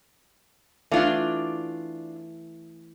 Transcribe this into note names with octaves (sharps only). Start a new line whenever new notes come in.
E3 A3 D4 F4 D5 F5